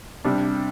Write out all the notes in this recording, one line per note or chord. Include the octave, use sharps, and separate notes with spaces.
C3 G3 D4